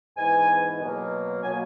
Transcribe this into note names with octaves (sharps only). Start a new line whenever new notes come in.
G#2 E3 B3 G#5
B2 F#3 A#3
B2 F#3 A#3 G#5